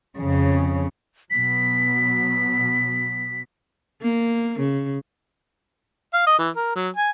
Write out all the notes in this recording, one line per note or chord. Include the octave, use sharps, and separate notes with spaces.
F2 C#3
B2 F#3 B3 B6
A#3
C#3
F5
D#5
E3
A#4
F#3
G#5